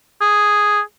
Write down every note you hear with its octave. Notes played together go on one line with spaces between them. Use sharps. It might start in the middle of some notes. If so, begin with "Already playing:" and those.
G#4